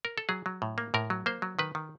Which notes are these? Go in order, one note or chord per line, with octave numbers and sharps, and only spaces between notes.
A#4
A4
F#3 G#4
F#3
A2
A#3
A2 A#4
F#3
A#3 C5
F#3
D#3 B4
D#3